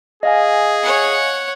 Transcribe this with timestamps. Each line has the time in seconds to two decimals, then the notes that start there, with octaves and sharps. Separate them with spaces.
0.23 G#4 D#5 F5 G#5
0.83 C#5 F#5